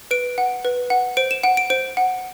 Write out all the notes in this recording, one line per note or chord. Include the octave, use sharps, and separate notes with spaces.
B4 D7
F#5
B4
F#5
C5 D7
E7
F#5 D7
D7
C5 D7
F#5